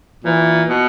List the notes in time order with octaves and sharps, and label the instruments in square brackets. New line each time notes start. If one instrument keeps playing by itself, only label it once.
[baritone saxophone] A#2 [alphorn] E3
[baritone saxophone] B2